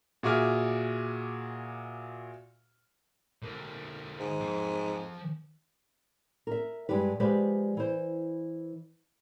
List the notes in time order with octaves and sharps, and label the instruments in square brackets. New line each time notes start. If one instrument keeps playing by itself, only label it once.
[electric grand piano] A#2 F#4 G#4 E5 D6 F6
[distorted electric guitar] D3 A#3
[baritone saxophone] G#2
[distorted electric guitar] F3 G5
[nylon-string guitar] A#4 E5
G2 G#3 D4 G4 B4
F3 G#3 G4 B4 C5 D5
E3 C5